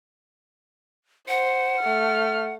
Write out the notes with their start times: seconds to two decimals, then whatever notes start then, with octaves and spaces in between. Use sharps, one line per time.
1.29 C5 F#5
1.80 A3 F6